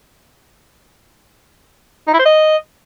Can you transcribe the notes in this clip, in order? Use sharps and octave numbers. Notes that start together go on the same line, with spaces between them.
D#4
E4
C5
D#5